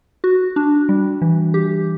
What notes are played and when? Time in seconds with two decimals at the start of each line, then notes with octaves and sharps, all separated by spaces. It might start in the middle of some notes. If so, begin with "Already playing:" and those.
0.24 F#4
0.56 D4
0.89 G3
1.22 E3
1.54 G4